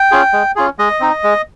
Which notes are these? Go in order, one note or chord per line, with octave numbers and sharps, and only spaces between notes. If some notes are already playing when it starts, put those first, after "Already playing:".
Already playing: G5
C#4 F4 G#4
G#3
C#4 F4 G#4
G#3 D#5
C4 D#4
G#3